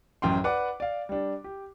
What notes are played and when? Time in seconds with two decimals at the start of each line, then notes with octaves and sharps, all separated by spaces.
0.22 A1 F#2 G5 C6
0.44 B4 D5 F#5 D6
0.80 D5 F5
1.09 G3 D4
1.44 G4